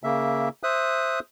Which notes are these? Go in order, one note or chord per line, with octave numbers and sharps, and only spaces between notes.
C#3 A#3 E5
C5 E5 D#6 F#6